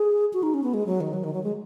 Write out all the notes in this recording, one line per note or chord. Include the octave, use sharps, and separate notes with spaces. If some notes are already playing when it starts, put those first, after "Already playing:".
Already playing: G#4
F#4
D#4
C#4
B3
G#3
F#3
D#3
F#3
D#3
F#3
G#3